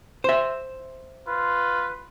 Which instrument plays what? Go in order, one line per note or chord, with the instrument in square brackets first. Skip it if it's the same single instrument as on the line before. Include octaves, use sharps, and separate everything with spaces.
[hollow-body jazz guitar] C5 E5
[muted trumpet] F4 [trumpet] B4